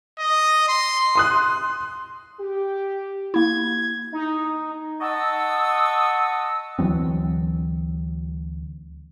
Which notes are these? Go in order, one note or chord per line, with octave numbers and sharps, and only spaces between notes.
D#5
C6
C6 D#6 F#6
G4
A#3 E4 G#6
D#4
D#5 F#5 A5 C#6 D#6 E6
D2 E3 F#3 C4